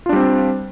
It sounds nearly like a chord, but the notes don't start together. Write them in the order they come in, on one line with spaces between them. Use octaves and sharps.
F4 D4 G3 C4